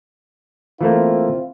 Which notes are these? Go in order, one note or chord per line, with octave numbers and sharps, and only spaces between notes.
E3 A3 A#3 C4 E4 F4